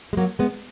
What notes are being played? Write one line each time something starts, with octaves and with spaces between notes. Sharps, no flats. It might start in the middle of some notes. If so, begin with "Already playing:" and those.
G#3
F#3 A#3
G#3 B3